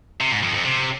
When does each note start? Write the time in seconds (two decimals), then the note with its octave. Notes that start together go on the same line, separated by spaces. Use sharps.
0.21 C3
0.32 G#2
0.43 F2
0.54 F2
0.65 C3